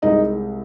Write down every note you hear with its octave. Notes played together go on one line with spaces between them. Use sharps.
C2 C3 G#3 D#4 D#5